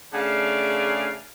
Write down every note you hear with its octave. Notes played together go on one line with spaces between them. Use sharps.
C#3 A3 D4 G#4 D5 F5